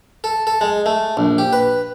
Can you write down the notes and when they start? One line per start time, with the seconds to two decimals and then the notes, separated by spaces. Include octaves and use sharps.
0.24 A4
0.47 A4
0.61 G#3
0.86 A3
1.17 A#1
1.38 G4
1.53 B4